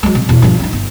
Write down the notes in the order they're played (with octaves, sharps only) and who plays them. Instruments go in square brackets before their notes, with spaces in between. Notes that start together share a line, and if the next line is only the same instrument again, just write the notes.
[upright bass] F#3 G#3
C3
E2 B2
G2 F3
C#4 D#4
G1